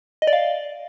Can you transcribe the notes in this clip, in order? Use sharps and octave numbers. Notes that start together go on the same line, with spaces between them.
D#5
D5
F5